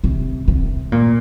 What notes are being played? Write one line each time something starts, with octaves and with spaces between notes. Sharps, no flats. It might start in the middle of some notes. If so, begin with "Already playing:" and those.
C3
C3
A#2